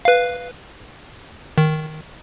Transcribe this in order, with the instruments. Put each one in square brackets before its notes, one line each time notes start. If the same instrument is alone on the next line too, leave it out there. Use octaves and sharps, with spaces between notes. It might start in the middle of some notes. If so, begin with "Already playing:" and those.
[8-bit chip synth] B4 F5
D#3